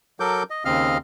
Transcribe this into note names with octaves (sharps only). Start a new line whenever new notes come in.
F#3 A4 A#4 D6 G6
D#5
D#2 C#3 C4 D#5 F5 F6